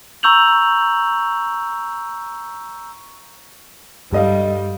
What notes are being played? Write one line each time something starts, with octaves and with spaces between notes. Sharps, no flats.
A#5 C#6 E6 G6 F7 F#7
G2 G3 A4 D#5 F5